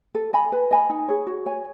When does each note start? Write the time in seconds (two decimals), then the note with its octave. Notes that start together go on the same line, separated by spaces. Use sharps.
0.15 A4
0.33 D#5 G#5 B5
0.52 B4
0.71 D#5 G#5 B5
0.89 D#4
1.08 G#4 C#5
1.27 F#4
1.46 C#5 G#5